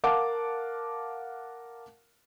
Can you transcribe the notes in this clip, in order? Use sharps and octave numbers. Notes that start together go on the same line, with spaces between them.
A#4 F5 F#5 A5 D6